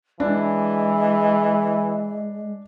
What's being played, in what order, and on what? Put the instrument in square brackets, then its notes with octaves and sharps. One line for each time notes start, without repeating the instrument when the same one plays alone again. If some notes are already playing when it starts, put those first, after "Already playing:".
[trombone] E3 [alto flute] G#3 [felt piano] D4